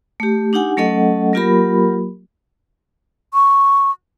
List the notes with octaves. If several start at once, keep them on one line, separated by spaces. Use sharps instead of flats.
A3 G4
D4 D#4 G4 F#5 G#5
F#3 A3 C#4 A4 D#5 F#5
F#3 A#3 F4 G4 A#4 B5
C#6